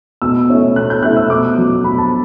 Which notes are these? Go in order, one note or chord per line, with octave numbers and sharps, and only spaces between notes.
B2 E6
A3 C#4 E4
B2 F#6
G6
A3 C#4 E4 F#6
E6
B2 D6
F#3 A3
B2 B5
A5